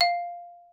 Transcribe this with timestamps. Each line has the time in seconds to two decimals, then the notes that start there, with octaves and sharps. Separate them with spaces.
0.01 F5